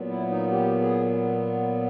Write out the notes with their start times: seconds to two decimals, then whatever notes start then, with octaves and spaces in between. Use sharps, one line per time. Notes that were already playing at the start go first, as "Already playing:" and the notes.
Already playing: A#2 F#3 B3
0.09 E4
0.30 D#4
0.52 G4
0.81 G#4